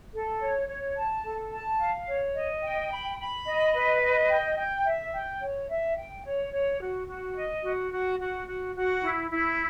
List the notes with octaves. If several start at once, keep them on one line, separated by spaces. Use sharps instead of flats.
A4
C#5
C#5
A5
A4
A5
F5
C#5
D#5
G5
B5
B5
D#5
B4
D#5
G5
G5
E5
G5
C#5
E5
G5
C#5
C#5
F#4
F#4
D#5
F#4
F#4
F#4
F#4
F#4
E4
E4